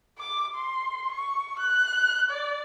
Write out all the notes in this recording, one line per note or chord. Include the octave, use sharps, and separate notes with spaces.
D6
C6
C#6
F#6
D5